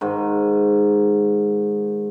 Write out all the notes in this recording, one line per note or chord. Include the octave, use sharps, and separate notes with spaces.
G#2 D#3